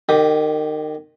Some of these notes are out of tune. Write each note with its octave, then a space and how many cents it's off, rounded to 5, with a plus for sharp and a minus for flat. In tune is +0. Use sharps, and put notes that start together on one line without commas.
D#3 -25 G4 +0 D#6 +0